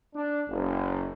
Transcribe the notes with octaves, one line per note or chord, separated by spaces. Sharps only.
D4
F#1